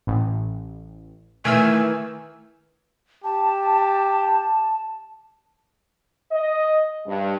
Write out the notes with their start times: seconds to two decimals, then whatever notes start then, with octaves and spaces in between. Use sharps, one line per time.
0.07 A1
1.45 D#3 E3 A3 G#5 E6 F6
3.24 G4 A5
6.32 D#5
7.07 G2